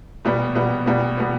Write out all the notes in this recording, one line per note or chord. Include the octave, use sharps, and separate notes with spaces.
B2 G3 B3
B2 G3 B3
B2 G3 B3
B2 G3 B3